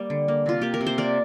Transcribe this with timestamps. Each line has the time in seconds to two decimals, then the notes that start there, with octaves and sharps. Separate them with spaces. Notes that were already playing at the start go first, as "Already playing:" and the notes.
Already playing: G3 A#3 D5
0.10 D3
0.28 A#3
0.46 C3 F4
0.61 A#3 G4
0.74 A#4
0.81 C3
0.87 C5
0.98 A#3 A#4 D5